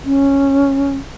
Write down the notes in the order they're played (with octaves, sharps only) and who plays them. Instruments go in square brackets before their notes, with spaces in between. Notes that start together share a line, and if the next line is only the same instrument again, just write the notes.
[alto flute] C#4